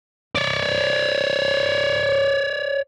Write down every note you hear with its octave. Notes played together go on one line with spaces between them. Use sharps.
C#5 D5